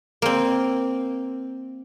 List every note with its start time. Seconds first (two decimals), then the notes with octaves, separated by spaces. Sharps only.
0.22 A#3 C4